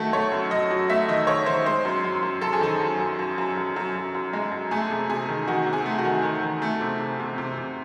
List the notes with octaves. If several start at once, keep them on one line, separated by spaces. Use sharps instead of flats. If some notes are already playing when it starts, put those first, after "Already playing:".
Already playing: D#3 F#3 A3 F#4 A4
A3 C#5
F#2
F#2 D#5
F#3
A3 E5
D#3 D#5
D#3 C#5
D#3 C5
G#3 C5
F#2
F#2
F#2
F#2 A4
G#4
D#3 A4
F#2
F#2
F#2
F#2
F#2
F#2
F#2
F#2
G#3
F#2
A3 G#4
C3
C3 G#4
D#3
D#3 F#4
C3
G#4
A3
F#4
D#3
D#3
D#3
A3
C3
C3
C3
C3
C3